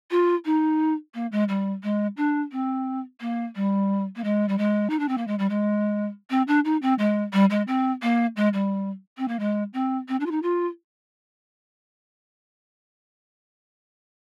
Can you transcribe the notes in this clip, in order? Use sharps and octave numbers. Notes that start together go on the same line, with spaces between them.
F4
D#4
A#3
G#3
G3
G#3
D4
C4
A#3
G3
A#3
G#3
G3
G#3
D#4
D4
C4
A#3
G#3
G3
G#3
C4
D4
D#4
C4
G#3
G3
G#3
C4
A#3
G#3
G3
C4
A#3
G#3
C4
C4
D4
F4
D#4
F4